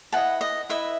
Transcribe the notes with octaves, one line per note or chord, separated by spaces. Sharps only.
E4 B4 D#5 F#5 A5
D#5
E4 B4 D#5 E5